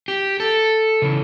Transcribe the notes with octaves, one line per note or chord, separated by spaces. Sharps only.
G4
A4
C#3 E3